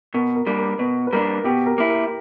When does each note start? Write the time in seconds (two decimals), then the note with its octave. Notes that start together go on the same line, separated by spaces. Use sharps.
0.14 B2 A#4
0.35 A#4
0.47 G3 A#3 D4
0.58 A#4
0.79 B2 B4
1.07 B4
1.13 G3 A#3 D4 A#4
1.44 B2 G4
1.66 A#4
1.78 A#3 E4
1.89 A#4